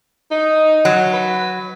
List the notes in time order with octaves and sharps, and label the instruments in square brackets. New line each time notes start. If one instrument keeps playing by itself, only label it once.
[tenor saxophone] D#4
[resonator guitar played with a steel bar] F#3
[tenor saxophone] B4